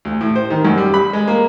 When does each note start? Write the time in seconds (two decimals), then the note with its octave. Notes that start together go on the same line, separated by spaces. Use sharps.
0.05 D2
0.21 A2
0.36 C5
0.50 D#3
0.65 F#2
0.78 G3
0.94 B5
1.13 G#3
1.28 A#3